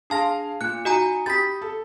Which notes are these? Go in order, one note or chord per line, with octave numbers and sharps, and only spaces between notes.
D4 G#4 F5 A5 C6 A#6
A#2 F#6 C#7
D#4 F#4 G#5 A#5
G4 B5 D#6 A6 B6
A4